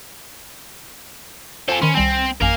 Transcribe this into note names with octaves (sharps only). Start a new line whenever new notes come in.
F4 A4 C5 G#5
D#3 C#4 B5 C6
C2 G3 C4 G#5
A1 F#2 A#4 F5 G#5